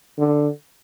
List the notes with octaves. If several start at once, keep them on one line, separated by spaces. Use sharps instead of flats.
D3